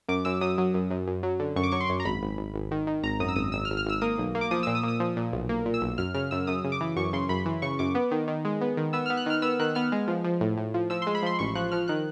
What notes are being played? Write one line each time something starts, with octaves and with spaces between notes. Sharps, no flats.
F#2 D6
F#2 E6
F#2 D#6
F#3
F#2
F#2
F#2
F#3
D3
F#2 C#6
D6
F#3 C#6
C6
F#2
A#5
G#1 B5
G#1
G#1
G#1
D#3
D#3
G#1 A#5
F#2 D#6
E6
G#1 D#6
G#1 E6
F6
G#1
F6
G#1 E6
A#3 D#6
B1
A#3
D6
F3 D#6
A#2 E6
D#6
A#2
D#6
F3
A#2
B1
A#3
A#2
E6
B1
F#2 F6
C#3 F6
F#2 E6
F#2 D#6
C#3
D6
E3
F#2 C#6
C#3 C6
F#2 B5
E3
C#3 C#6
F#2 D6
B3
D#3
D#3
G#3
B3
D#3
B3 E6
B3 F6
F#6
D#3 F6
B3 E6
D#3 F#6
B3 F6
G#3
F3
F3
A2
A2
F3
F3 E6
G#3 C6
B5
F3 C6
A1 C#6
F3 F#6
F3 F6
D#3 F#6